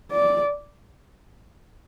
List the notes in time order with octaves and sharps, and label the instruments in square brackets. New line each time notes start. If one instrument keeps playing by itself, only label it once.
[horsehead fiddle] D5